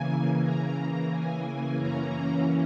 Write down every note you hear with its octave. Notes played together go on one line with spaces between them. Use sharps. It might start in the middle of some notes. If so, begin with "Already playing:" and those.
Already playing: C#3 E3 A#3 G#5
A#5
G#5
F#2 E3 A#3 C#4 A#5